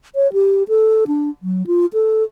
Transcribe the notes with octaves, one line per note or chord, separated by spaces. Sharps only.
C#5
G4
A4
D4
F#3
F4
A4